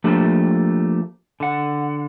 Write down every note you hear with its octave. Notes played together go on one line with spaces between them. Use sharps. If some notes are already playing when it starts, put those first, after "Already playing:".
F3 A3 A#3 D4 G4
D3 F#5